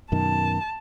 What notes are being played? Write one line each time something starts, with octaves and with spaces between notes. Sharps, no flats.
F#2 B2 D#3 A5